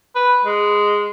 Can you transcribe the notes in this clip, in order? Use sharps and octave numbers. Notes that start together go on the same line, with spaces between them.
B4
G#3